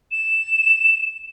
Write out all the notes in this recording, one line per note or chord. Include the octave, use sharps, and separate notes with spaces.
E7